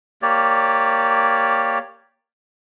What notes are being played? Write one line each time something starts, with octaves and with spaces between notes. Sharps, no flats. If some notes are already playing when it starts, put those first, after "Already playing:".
A#3 G4 C#5 D5